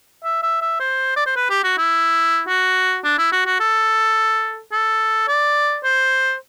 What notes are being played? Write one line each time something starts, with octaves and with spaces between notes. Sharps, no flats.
E5
E5
E5
C5
D5
C5
B4
G4
F#4
E4
F#4
D4
E4
F#4
F#4
A4
A4
D5
C5